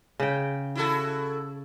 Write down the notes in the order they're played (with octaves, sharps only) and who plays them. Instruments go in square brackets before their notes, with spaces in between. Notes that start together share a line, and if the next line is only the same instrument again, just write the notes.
[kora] C#3 G5
[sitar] E4 F#4 A4